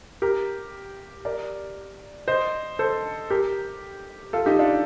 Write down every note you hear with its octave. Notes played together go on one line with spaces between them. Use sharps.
G4 A#4
A#4 D5
C5 D#5
A4 C5
G4 A#4
F4 A4
D#4 G4
D4 F4